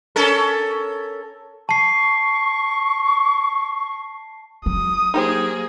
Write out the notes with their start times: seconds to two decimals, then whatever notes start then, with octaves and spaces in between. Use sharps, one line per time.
0.16 C#4 A4 A#4
1.69 A5 C#6 C7
4.66 F#3 D#6
5.14 A#3 D#4 G4 G#4 C5